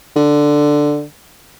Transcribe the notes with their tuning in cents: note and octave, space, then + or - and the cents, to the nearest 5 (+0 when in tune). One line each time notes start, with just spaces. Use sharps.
D3 +5